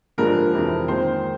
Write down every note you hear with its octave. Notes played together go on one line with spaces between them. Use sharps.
G2 D3 F3 G#3 A#4
F2 C3 E3
D#2 D#3 G#3 C5